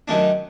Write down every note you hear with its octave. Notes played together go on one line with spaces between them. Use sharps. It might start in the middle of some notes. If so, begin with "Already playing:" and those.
F#2 D#3 A3 D4